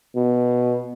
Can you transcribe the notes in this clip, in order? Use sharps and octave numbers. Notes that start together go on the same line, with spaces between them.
B2